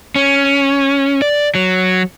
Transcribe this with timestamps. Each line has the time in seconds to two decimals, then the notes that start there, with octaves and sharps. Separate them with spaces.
0.16 C#4
1.22 D5
1.55 F#3